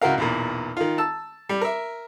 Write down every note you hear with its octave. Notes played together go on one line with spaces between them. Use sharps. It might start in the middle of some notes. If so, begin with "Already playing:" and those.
C#2 E4 F#4 A#4 F5
B1 E2 A#2
D#3 F4
A5 E6
G3
A#4 E5